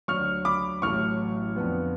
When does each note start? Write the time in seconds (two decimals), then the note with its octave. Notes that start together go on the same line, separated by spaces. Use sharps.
0.08 D2 D3 F#3 C#6 F6
0.45 B5 D6
0.82 A1 A2 F#3 A3 C#6 F6
1.56 F2 D3 F3 B3